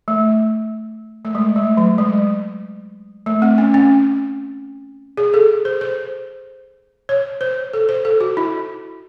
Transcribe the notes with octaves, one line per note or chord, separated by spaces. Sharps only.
A3
A3
G#3
A3
F#3
G#3
A3
C4
C#4
C#4
G#4
A4
C5
C5
C#5
C5
A4
C5
A4
F#4
E4